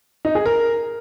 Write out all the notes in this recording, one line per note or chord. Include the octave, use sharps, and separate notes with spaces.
D#4
G#4
A#4